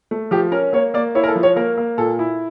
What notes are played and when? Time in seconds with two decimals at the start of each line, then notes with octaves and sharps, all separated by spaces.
0.11 A3
0.31 F3 G4
0.52 C#4 A#4
0.73 A#3 C#5
0.94 A#3 D5
1.15 E4 C#5
1.24 A#4
1.28 A4
1.36 F3
1.43 C#5
1.56 A#3 A#4
1.78 A#3
1.97 A#2 A4
2.19 E4